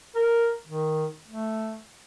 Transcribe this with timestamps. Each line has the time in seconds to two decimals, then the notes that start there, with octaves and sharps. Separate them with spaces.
0.15 A#4
0.67 D#3
1.28 A3